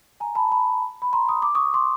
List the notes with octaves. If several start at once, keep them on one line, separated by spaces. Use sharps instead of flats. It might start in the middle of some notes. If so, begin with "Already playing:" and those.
G#5 A#5
A5 B5
A5 B5
B5
A#5 C6
D#6
D6
C#6 D#6
C6 D6